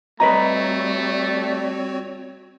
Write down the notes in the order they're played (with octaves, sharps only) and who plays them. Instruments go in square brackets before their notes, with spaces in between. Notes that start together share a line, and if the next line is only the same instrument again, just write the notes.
[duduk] G3 [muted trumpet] A3 [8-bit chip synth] C4 F#4 C#5 [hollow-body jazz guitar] B4 D#5 A#5